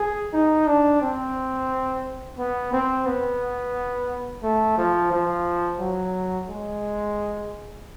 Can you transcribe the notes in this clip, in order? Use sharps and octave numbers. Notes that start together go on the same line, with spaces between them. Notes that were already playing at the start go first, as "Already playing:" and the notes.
Already playing: G#4
D#4
D4
C4
B3
C4
B3
A3
F3
F3
F#3
G#3